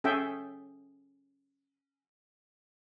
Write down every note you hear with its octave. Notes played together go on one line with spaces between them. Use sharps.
C#4 G#4 A4 E5 G5